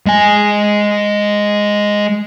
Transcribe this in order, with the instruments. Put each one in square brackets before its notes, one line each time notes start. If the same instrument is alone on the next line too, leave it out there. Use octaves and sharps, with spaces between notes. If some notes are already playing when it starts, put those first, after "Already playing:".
[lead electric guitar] G#3 G#5